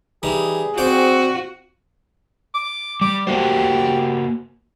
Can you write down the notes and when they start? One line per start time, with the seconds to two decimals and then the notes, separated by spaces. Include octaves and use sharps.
0.23 E3 G3 D#4 G#4
0.78 C4 F#4 C5 D5 G5
2.54 D6
3.01 G3 D6
3.27 A#3 F#4 G4 C5